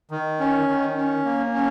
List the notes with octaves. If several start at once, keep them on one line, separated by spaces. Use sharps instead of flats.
D#3
C#4
D#3
C#4
A#3
C#4